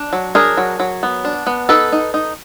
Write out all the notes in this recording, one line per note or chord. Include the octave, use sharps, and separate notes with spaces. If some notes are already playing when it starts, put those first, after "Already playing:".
Already playing: D4
F#3
D4 G#4 A#4
F#3
F#3
B3
D4
B3
D#4 A4 B4
D#4
D#4